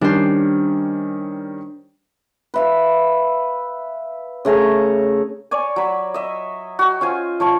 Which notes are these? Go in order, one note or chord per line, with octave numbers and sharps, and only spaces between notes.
D#3 G3 C#4 D4 C5
B4 E5 F5
C#3 A3 G#5 A#5
C#5 D5 G#5
F#3 B5
D#5 E5
F#4 G5
C#4 F4 C5 G#5
F3 C#5 C#6